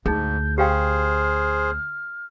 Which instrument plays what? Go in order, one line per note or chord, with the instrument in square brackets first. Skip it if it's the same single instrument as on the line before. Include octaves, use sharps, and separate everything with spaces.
[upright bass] D2 [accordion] G#2 [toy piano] D#4 G#4 [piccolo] G6
[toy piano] G4 F5 G5 [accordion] G#4 C5 [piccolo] F6